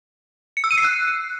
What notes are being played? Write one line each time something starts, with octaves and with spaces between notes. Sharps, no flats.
C#7
E6
D#7
C7
F#6